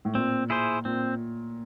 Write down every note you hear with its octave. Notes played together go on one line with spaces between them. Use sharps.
A2
A#2 C4
E4 G#4 C5
A#2 C4